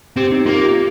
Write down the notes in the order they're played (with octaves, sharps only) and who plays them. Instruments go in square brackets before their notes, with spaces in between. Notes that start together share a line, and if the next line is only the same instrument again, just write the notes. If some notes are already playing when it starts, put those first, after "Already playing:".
[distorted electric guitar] C4 [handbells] G4
[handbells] D#4
[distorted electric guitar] A#3 [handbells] F4
[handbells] G4